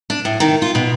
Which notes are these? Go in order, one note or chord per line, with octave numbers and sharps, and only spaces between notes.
D4
A2
D#3
F4
B2